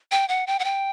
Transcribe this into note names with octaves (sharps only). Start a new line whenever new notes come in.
G5
F#5
G5
F#5
G5